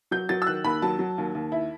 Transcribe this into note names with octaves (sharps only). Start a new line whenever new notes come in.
F#3 G6
F#3 A6
E6
D#3 F#6
D#2 B5
F#3 A5
F#3
D#2
D#2
E4